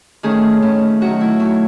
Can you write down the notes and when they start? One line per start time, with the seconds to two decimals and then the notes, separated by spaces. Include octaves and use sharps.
0.23 D#3 A3 C#4 G#4
0.62 D#3 A3 C#4
1.01 D#3 F#3 A3 C#4 F#4
1.21 E4
1.40 D#3 F#3 A3 C#4